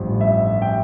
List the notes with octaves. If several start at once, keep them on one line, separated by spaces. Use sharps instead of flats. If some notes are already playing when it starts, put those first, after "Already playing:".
Already playing: A1 G2 F3
E5
G5